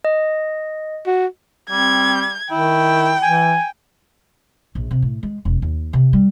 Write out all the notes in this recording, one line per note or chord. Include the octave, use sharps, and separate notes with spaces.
D#5
F#4
G3 C4 G#6
D#3 E4 G5
E3 G#5
A#1
C3
A2
G#3
E1
D#2
C3
G3